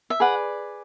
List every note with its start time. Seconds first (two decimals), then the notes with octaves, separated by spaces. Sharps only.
0.10 E5
0.20 G#4 B4 D5 F#5